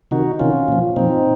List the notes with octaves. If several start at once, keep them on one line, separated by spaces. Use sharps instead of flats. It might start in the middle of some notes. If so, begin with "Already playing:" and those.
C3 D#3 D#4 F#4
C3 D#3 C#4 F4
A#2 F3
A#2 F3 C4 D#4